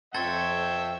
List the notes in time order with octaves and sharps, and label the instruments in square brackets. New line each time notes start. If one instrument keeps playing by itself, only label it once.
[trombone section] F2 [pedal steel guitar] A4 C5 C#5 [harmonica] E5 G5 [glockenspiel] G#6 A6